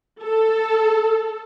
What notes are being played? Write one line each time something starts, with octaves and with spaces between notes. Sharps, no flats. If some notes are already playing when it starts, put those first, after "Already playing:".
A4